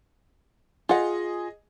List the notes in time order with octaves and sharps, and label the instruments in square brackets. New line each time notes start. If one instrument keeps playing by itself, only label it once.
[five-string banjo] F4 F#5 [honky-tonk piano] G#4 D#5